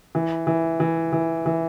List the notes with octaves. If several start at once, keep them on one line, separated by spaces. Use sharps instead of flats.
E3
E3
E3
E3
E3